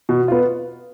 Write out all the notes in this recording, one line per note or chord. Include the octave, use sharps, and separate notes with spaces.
B2
B3 F4